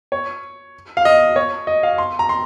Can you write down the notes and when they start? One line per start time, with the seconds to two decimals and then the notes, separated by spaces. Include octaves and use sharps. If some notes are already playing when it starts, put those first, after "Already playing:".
0.12 C#5
0.97 F5
1.05 D#5
1.36 C#5
1.67 D#5
1.83 F5
1.98 C6
2.19 A#5
2.29 C6